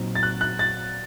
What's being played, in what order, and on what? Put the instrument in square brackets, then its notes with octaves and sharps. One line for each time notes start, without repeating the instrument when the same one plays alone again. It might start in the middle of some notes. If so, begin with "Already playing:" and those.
Already playing: [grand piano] A#2 F#3 C4 D#4
A6
F#6
F#6
A6